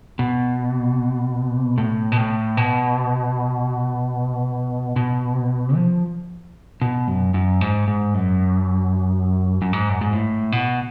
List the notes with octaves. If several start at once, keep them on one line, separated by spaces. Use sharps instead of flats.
B2
A2
B2
A2
B2
B2
F3
B2
F#2
F#2
G#2
G#2
F#2
F#2
G#2
F#2
G#2
A2
B2